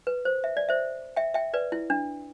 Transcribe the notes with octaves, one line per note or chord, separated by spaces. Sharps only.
B4
C5
E5
D5
C5 E5
E5 G5
E5 G5
B4 D5
E4
D4